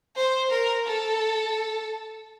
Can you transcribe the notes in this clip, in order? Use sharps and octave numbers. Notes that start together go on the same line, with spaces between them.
C5
A#4
A4